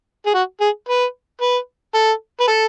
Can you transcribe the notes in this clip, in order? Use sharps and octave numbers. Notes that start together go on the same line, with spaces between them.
G#4
F#4
G#4
B4
B4
A4
B4
A4